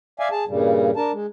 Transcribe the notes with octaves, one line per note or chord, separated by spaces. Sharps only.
D5 E5 F5 G#5
G#4 A5
G2 A#2 C#3 G3
D4 A#4 A5
G#3